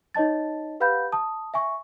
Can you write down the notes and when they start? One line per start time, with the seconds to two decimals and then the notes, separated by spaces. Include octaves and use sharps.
0.14 D#4 C#5 D#5 A5 A6
0.80 G4 B4 F5 F#5 B5 G6
1.12 A5 D#6
1.54 E5 G#5 C#6